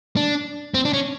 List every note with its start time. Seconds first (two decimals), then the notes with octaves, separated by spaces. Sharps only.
0.16 D4
0.74 C4
0.85 D4
0.93 C#4